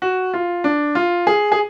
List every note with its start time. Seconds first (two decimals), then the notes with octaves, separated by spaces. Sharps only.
0.02 F#4
0.34 F4
0.64 D4
0.95 F4
1.27 G#4
1.52 G#4